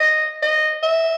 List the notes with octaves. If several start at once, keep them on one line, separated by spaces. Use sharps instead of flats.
D#5
D#5
E5